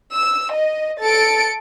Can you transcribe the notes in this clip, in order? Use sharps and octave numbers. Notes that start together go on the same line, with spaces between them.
E6
D#5
A4 A6 C#7 D7